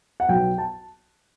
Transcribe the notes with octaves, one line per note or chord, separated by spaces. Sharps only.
F#5
B1 B2 F#3 G5
A5